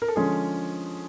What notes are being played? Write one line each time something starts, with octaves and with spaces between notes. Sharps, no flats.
A#4
A4
D3 F3 G#3 C#4 G#4